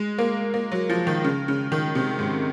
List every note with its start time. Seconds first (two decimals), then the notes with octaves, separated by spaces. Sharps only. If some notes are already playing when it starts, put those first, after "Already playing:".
Already playing: G#3
0.18 A#3
0.54 A#3
0.72 F#3
0.89 F3
1.07 D#3
1.25 C#3
1.48 C#3
1.72 D#3
1.95 C3
2.19 G#2